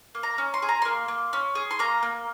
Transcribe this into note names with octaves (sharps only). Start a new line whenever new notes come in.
A#3
A#5
C#4
C6
G#4
A#5
A#3 C6
A#3
C#4
G#4
C6
A#3 A#5
A#3